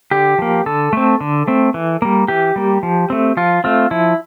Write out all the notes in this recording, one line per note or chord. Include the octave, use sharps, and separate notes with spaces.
D3 G4
F3 A#3
D3 A4
A3 C4
D3
A3 C4
E3
G3 A#3
E3 G4
G3 A#3
F3
A3 C4
F3 F4
A3 C4 F4
F3 E4